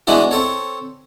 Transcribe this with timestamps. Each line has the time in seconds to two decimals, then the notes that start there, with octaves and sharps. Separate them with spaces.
0.07 E3 G#3 B3 D4 E4 F#4
0.31 C4 A4 C#5